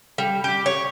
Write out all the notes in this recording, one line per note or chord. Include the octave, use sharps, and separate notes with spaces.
G3
G4
C#5